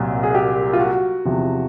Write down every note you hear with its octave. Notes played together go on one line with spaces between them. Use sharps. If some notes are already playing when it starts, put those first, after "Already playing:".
Already playing: C2 A#2 F#3
G#4
G4
F4
F#4
E2 C3 F3